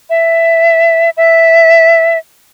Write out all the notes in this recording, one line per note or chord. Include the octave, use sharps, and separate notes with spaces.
E5
E5